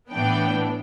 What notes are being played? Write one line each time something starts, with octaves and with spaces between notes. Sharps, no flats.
A2 E3 B3 D4 G5